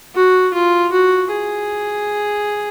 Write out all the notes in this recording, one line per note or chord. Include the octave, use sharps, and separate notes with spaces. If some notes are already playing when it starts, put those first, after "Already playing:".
F#4
F4
F#4
G#4